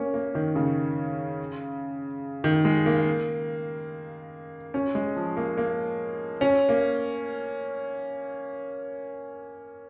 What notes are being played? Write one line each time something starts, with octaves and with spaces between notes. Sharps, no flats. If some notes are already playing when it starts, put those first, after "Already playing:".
Already playing: A#3 C#4
A#3
D#3
C#3
D#3
G#3
A#3
C#4
G#3
F3
A#3
A#3
C#4
A#3